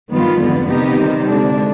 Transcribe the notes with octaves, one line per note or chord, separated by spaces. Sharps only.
G2 D#3 B3 F4
F2 D3 G#3 B3
C3 D#3 B3 D#4 G4
C3 D#3 G3
D3 G#3 D4